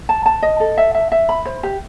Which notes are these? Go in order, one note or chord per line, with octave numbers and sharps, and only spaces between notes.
A5
A5
D#5
A4
E5
E5
E5
B5
C5
G4